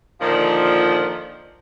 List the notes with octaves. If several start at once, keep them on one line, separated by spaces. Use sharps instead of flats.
A#2 D3 D#3 F3